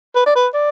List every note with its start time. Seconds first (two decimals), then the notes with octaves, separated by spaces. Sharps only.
0.16 B4
0.26 D5
0.36 B4
0.54 D5